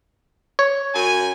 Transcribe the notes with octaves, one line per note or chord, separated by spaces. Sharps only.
C#5
F#2 G#5